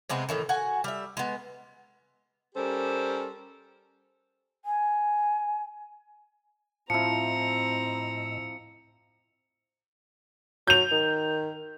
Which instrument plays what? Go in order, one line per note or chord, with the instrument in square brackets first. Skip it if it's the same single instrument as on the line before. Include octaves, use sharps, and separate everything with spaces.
[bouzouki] C3 G#3 B3 C4
A2 D#3 E3
F#4 F#5 G#5
G3 E5
G#3 B3
[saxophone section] G3 C#4 G4 A4 A#4 C5
[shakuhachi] G#5
[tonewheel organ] A2 D#5 E6 [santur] F3 E4 [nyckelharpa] C4 A#5 [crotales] C#7
[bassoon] F#3 [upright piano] G6 F7
[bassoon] D#3